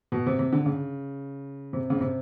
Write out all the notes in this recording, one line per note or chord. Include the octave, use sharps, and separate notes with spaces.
B2
C3
C3
D3
C#3
C3
C#3
C3